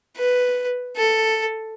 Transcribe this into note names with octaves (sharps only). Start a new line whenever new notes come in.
B4
A4